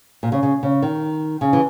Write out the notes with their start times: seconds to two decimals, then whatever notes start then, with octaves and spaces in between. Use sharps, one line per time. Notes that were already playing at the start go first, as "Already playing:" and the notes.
0.23 A#2
0.32 C#3
0.43 C#3
0.63 C#3
0.82 D#3
1.41 C#3
1.53 E3